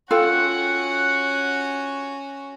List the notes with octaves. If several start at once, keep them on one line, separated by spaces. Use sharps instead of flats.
C#4 F4 F#4 A4 F#5 G5